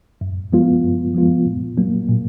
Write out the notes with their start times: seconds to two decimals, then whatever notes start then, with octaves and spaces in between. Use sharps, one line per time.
0.21 F#2
0.52 F3 G#3 B3 F4
0.84 F#2
1.14 F3 G#3 B3 F4
1.46 A#2
1.77 F#3 A#3
2.09 A#2